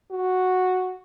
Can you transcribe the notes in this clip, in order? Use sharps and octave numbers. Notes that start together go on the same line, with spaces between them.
F#4